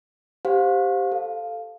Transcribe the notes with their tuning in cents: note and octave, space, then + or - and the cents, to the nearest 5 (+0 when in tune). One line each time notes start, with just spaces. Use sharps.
G4 +0 C5 +0 F5 +30
A4 +0 F5 +0